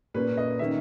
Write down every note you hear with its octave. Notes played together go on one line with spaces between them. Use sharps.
A#2 A#3 C#4 B4
D#5
D#3 A#3 C#4 E5